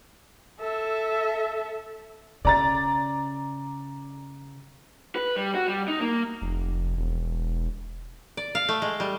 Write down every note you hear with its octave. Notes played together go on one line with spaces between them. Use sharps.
A4 E5
C#3 D5 A#5 A6
B4
G3
F#4
G3
D#4
A#3
F1
E1
D5
F5
A3
G#3
G3